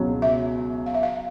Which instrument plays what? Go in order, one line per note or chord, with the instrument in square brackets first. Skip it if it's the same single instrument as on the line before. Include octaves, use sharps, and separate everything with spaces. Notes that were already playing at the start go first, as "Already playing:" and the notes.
Already playing: [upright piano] C#2 B2 F#3
[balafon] E5
F5
E5
F5